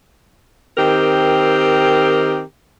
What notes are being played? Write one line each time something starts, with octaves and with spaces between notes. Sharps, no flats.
D#3 C4 G4 A#4